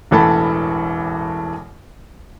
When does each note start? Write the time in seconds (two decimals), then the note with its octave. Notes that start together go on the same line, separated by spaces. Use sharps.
0.11 E1 A1 E3 A4 A5 B5